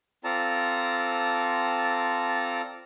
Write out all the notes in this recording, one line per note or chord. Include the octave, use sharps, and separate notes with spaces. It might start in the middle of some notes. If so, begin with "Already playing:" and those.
C4 F4 A4 D5 A5 A#5